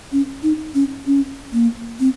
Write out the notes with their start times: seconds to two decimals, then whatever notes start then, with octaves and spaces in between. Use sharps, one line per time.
0.12 C#4
0.43 D#4
0.74 C#4
1.06 C#4
1.53 A#3
2.00 C4